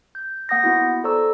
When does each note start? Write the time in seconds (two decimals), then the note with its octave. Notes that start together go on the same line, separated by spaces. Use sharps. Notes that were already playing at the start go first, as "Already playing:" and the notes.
0.15 G6
0.49 A#3 F#5 D#6 G6 A#6
0.64 B3 E4 F#4
1.04 A4 C5 D5 A#5 C#6 E6